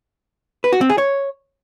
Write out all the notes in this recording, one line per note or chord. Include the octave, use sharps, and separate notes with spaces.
B4
F#4
C4
G#4
C#5